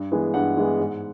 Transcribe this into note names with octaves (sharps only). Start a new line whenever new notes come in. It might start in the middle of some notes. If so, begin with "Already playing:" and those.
Already playing: G2
E3 G#3 B3
G2 F#5
E3 G#3 B3
G#2